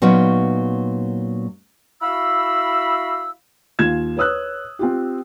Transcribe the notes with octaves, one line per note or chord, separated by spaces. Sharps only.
A#2 F#3 B3 C#4 D#4
E4 F#4 F5 B5 E6
D#2 F4 G#6 E7
B4 C#5 D#6 E6 F#6
C4 F4 G4